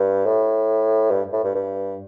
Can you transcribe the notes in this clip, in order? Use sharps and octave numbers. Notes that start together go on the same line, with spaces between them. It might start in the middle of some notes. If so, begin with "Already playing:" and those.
Already playing: G2
A2
G2
A2
G2
G2